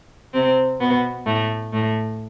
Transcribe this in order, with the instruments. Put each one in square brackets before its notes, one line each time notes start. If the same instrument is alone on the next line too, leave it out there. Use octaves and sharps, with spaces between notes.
[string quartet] C3 C4
B2 B3
A2 A3
A2 A3